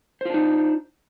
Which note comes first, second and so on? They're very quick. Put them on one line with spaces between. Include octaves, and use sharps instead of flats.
C5 F4 D4 D#4